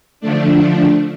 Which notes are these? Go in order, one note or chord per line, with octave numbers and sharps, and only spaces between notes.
D3 F3 A3 D4